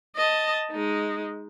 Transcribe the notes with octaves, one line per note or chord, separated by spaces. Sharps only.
D#5 A5
G#3 D#4